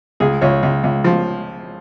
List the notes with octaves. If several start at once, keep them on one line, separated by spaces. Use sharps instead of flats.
C#2 G#4
C#2 C#5
C#2
C#2
F3